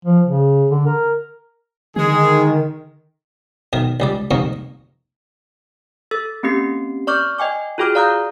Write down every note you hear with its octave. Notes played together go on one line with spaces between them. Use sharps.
F3
C#3
D3
A#4
D3 D#3 G#3 G#4
B1 D#3 A#4
C#2 G3 D5
C2 F2 A#3 D#4 A#4 C#6
A4 E6 A6
A#3 C4 C#4 G4 C7
D5 C#6 D6 F6 G6
D#5 G5 G#5 D6
F4 F#4 G#4 G5 D6 F6
D5 F5 A#5 D#6 F#6 G6